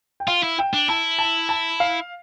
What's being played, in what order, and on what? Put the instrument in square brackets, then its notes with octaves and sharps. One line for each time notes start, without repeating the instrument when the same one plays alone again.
[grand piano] G5
[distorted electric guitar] F4 [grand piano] F5
[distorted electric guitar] E4
[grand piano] G5
[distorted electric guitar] D4
[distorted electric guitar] E4 [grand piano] A5
[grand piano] A5
A5
F5